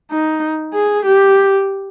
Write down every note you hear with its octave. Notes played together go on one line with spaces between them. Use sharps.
D#4
G#4
G4